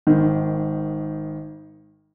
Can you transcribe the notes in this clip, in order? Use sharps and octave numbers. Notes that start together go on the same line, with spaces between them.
G#1 D#3